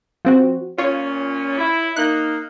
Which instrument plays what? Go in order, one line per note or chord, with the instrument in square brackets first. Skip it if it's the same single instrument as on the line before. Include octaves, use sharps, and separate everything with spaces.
[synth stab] F3 C4 F#4
[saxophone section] A#2 C#4 [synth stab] F4 C#5
[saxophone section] E4
[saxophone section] A#3 D#4 [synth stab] F#6